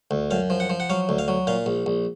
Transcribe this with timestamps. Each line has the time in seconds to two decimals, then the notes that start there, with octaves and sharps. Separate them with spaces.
0.11 D2
0.31 F#2 F5
0.50 F3
0.60 F#5
0.70 F3
0.80 F#5
0.90 F#3 F5
1.09 D2
1.18 F5
1.28 F#3
1.47 A#2 F5
1.66 A#1
1.86 A#1